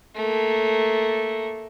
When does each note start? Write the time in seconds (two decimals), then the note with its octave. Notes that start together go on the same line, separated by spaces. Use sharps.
0.16 A3 A#3